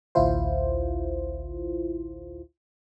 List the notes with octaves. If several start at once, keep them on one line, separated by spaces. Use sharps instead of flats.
A1 D2 E4 F4 C5